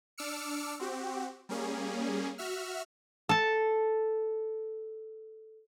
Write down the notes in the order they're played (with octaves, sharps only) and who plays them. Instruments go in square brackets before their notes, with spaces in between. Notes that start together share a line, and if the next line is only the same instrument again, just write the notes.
[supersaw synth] D4 D6 E6 F6 C#7
C4 F#4 G4
G3 A#3 C#4 G#4
F#4 E5 F6
[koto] A4 A5